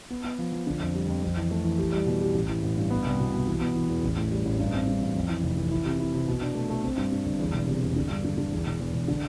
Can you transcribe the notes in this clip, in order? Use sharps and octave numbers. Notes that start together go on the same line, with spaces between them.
B3
B3
F3
F3
D3
F2
G3
F2
F2
E3
A3
E3
G4
G3
B2
G4
A1
E3
A1
G2
B3
C2
B2
B2
E3
B3
E3
E2
A1
A2
G3
A1
G2
C4
G2
A1
F2
E3
F1
E3
E4
C3
E4
C3
B2
D4
A3
A3
C4
G2
G2
G1
E2
E1
C3
E2
D3
G2
D3
D3
E2
E1
E2
E1
D3